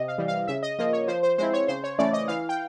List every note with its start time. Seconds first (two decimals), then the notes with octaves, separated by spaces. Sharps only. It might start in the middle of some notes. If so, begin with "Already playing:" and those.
Already playing: C3 D#5
0.08 F5
0.18 E3 G3
0.28 F5
0.47 C#3 E5
0.63 D#5
0.79 F3 A#3 D#5
0.93 C#5
1.08 F3 C5
1.23 C5
1.38 G#3 C4 E4 C5
1.53 C#5
1.68 C#3 C5
1.84 C#5
1.99 E3 A3 C#4 D5
2.13 D#5
2.28 E3 F5
2.49 G5